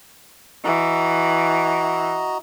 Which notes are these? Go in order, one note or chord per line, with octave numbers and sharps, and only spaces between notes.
E3 F#4 D#5 A#5